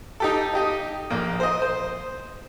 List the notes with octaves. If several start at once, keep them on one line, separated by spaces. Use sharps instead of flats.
D#4 G4 A4
D#4 G4 D#5
A#1 A#3
C5 D#5
C5